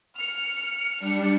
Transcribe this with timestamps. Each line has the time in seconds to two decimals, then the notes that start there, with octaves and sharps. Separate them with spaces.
0.17 F6 C#7
0.99 G3 D4 C#7